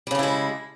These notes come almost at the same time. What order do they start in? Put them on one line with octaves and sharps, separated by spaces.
G3 C#3 D4 E4 G#3